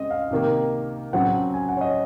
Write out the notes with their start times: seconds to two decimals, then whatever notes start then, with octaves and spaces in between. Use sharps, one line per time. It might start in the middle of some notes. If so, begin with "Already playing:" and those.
Already playing: C#3 G#3 C4 D#5
0.11 F5
0.31 C3 D#3 A#3
1.13 C#3 F#3 C4 F#5
1.54 G#5
1.69 F#5
1.77 C#5
1.81 D#5